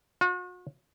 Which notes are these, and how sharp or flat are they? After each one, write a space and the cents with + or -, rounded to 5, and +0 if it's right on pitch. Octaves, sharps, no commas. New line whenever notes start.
F#4 -45